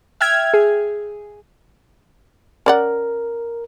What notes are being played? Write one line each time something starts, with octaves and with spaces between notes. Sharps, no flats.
E5 G5 F6 G#6
G#4
C#4 A#4 D5 F#5